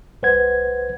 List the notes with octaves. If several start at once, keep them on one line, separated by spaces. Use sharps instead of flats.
C2 B4 C5 F#5 G#6